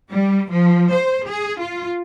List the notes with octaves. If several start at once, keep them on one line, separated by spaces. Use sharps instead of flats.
G3
F3
C5
G#4
F4